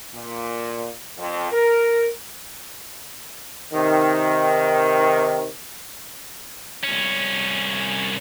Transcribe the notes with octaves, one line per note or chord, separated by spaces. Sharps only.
A#2
F2
A#4
C3 D#3
C2 C#4